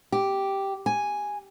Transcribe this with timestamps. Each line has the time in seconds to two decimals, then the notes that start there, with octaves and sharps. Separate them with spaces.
0.12 G4
0.86 G#5